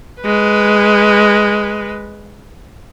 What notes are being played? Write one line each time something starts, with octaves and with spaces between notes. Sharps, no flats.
G#3 B4